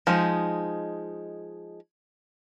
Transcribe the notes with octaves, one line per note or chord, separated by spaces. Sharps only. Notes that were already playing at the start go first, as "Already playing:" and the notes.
F3 G#3 D#4